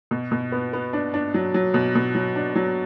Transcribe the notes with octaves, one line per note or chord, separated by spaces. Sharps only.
B2
B2
B3
B3
D4
D4
F#3
F#3
B2
B2
F#3
D4
F#3